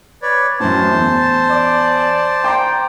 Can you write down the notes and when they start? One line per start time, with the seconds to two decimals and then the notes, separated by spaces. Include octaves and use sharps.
0.22 B4 C#5 D5
0.60 F#2 A2 C5 A5
0.93 E2
1.50 D5
2.44 G5 A#5 C6 D6